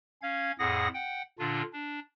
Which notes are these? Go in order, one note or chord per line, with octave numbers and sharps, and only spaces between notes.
C#4 F5 G#6
F2 A2 G#4 F#5 D#6 A#6
F#5 G5
A#2 D3 D4 F4
D4